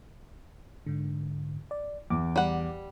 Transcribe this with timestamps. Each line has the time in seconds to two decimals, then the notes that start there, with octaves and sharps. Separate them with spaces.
0.87 G#2 D3
1.71 D5
2.10 E2 D6
2.36 G3 F#5